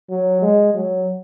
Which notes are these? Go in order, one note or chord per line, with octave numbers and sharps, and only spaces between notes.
F#3
G#3
F#3